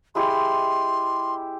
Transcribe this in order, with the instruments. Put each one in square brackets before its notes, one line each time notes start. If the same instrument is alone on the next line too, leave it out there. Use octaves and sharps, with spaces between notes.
[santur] G#3 E4 G4 [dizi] C6